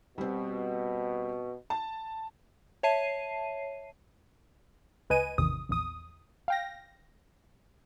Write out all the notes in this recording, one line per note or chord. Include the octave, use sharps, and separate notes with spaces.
B2 G3 C4
A5
C#5 E5 A5 C7 D#7
C#2 B4 D#5 G#5 D#7
A1 E2 C3 D#3 D#6
A#1 E2 D#6
F5 G5 A#6